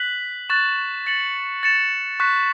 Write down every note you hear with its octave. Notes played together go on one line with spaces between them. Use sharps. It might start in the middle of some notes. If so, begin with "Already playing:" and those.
Already playing: F#6 B6 F#7
C#6 F#6 A6 E7
A6 C#7 F#7
A6 C#7 E7
C#6 F#6 B6